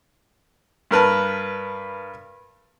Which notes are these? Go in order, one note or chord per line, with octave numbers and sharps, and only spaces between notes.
G2 A#4 B4 A5